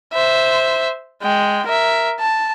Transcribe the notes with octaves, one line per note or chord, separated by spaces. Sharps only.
C5 E5
G#3 G5
A#4 E5
A5